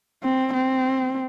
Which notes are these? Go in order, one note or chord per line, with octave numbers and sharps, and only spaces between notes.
C4
C4